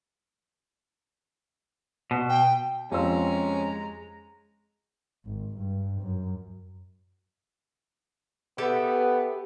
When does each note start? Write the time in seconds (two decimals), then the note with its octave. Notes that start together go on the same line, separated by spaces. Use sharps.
2.11 B2
2.29 G5
2.91 F2 G#3 C#4 F4 G4 C5 A#5 E6
5.25 G#1
5.57 G2
6.00 F#2
8.58 B3 G4 A4 E5